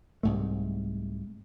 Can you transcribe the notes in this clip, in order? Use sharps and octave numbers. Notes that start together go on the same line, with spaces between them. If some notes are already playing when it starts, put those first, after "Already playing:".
C2 G#2 A3